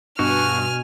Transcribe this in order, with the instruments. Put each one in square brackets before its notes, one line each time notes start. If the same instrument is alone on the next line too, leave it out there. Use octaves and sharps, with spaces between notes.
[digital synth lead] G2 [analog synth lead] B2 [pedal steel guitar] F#4 [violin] G#5 F6